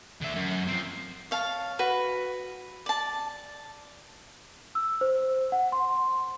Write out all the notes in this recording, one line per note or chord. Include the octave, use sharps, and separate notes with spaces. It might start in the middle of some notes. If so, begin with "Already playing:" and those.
D3 E5
F#2
F3 C4
C#5 F5 A5
F#4 B4
D5 A5
E6
C5
F#5
C6